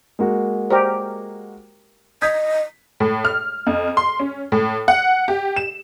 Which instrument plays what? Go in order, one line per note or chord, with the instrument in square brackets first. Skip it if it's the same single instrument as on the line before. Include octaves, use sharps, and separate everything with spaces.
[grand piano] G#3 A#3 F#4
[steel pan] G4 A#4 [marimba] C5 D5
[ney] D#5 [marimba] D#6 G6 G#6 [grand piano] B6
[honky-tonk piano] A2
F6
F2
C6
C#4
A2
F#5
G4
E7